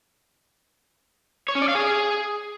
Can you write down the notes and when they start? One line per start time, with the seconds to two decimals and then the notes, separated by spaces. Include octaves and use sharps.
1.49 C#5
1.55 C#4
1.62 D5
1.68 F5
1.75 G#4